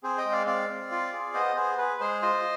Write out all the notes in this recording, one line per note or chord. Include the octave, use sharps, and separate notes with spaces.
C4 G#4 C5
D#5 G5
G#3
D5 F5
C4 D5 F5
C4
F4
G#4
B3 C5 D#5
B3 G#4 C5
G#4 B4
G#3 G#4 C5
F4 C5 D#5